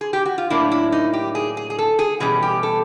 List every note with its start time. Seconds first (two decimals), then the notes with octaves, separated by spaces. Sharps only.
0.01 G#4
0.13 G4
0.26 F#4
0.38 F4
0.50 A2 F#3 A#3 D4 E4
0.72 E4
0.92 D#4
1.13 G4
1.35 G#4
1.57 G#4
1.70 G#4
1.79 A4
1.99 G#4
2.20 E2 B2 G3 C#4 G#4
2.42 G4
2.63 A4